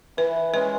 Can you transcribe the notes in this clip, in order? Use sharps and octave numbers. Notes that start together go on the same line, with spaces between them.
E3 B4
G#3 C#4 B4